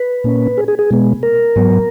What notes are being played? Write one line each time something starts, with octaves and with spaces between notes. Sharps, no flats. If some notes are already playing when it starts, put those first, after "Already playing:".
Already playing: B4
A#2 A#3 C#4
G#4
G#4
G#4
B2 G#3 B3
A#4
G#2 F#3 B3